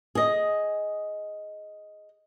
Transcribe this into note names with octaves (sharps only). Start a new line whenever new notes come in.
G#4 D#5